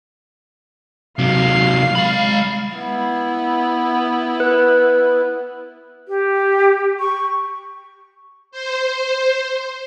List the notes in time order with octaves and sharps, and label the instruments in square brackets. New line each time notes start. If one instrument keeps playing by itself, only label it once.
[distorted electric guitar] C3 F#3 [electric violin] F5 C7
[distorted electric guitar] G#3 B5
[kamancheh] B3 E4
[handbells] B4
[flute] G4
C#6
[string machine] C5